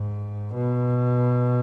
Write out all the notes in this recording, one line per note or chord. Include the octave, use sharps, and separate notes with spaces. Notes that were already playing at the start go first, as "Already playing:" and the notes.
Already playing: G#2
B2